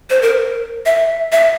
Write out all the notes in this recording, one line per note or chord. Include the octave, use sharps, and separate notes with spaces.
C5
A#4
E5
E5